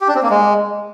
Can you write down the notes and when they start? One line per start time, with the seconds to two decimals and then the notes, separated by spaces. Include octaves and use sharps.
0.01 G4
0.08 D4
0.15 C4
0.23 A#3
0.30 G#3